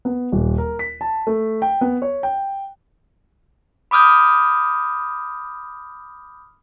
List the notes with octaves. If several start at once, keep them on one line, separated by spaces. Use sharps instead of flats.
B3
D#1
A#4
B6
A5
A3
G5
B3
C#5
G5
B5 D6 D#6 F6 G6